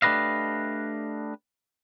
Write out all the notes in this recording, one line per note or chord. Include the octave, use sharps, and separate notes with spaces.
A3 D4 G4 B4 D#5 F5